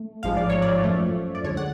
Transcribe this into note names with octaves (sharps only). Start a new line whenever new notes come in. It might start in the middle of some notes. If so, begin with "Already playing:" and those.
Already playing: A3
A1 G#2 F3 G#3 F5
D5
C#5
D5
F#2 F3 A3
D5
D2 D3 G#3 C#5
F#5